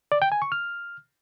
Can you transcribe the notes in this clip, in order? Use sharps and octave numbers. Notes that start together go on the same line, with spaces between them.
D5
G5
G#5
C#6
F6